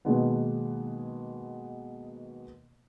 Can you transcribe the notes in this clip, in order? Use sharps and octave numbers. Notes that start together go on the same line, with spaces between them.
B2 D#3 G#3 A#3 B3